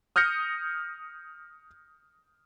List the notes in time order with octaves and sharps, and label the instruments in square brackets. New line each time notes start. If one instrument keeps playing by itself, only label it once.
[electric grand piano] D#6 F6 G6 A#6 C#7